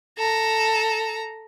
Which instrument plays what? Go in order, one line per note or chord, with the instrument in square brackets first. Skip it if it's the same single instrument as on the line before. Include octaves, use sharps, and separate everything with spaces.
[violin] A4 A#5